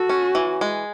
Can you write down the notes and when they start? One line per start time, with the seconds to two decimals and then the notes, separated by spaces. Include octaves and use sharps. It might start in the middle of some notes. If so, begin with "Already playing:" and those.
Already playing: F#4 A4
0.09 C#4
0.35 E3
0.61 G#3